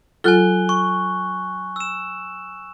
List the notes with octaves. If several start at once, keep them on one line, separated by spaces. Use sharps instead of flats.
F#3 F4 A4 G#5 F#6 G7
C#6
E6 E7